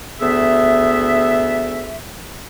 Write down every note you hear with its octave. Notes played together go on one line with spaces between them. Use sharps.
D2 B3 G#4 E5